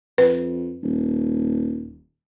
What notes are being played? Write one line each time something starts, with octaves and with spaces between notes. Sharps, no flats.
F2 B4
D#1